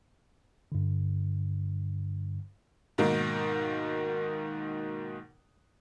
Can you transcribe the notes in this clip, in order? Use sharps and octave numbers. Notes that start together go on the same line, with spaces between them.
G2 D3
G#2 B2 D#3 A#3 D#4